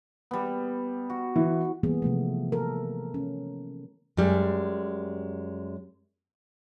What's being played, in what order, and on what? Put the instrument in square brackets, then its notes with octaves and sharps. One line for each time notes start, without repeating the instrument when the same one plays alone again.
[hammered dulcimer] G3 B3
F#4
[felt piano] E3
[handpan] E3 G3 A#3 B3 G#4
C3 F3 A3
A4 A#4
C#4
[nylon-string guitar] F#2 G3 G#3